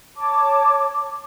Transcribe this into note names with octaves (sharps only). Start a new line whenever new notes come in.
C#5 A5 D6